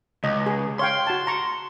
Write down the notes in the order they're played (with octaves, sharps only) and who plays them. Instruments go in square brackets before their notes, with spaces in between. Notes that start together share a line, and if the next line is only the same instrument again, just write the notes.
[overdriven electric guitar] C#2 [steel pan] D#5
[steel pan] G#4
[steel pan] C#5 F5 G5 [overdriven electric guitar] C6
[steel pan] F#4 A5
A#5 C#6